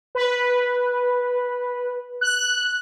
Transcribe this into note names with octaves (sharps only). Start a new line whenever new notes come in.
B4
F#6